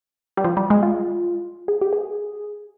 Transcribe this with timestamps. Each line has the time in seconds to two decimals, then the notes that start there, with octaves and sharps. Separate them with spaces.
0.37 G3
0.44 F3
0.57 G3
0.70 G#3
0.83 F4
1.68 G#4
1.81 G4
1.93 G#4